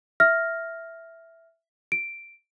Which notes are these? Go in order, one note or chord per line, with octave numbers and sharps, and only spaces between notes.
E5 F6 A#6
D7